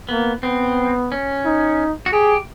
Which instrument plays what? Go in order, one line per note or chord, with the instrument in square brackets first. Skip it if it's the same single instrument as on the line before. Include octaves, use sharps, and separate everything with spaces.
[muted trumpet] A#3 [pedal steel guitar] B3
[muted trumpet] B3 [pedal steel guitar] C4
[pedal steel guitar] C#4
[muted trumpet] D#4
[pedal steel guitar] F#4
[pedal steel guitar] G4 [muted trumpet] G#4